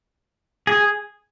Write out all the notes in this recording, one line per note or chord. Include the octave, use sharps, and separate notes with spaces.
G#4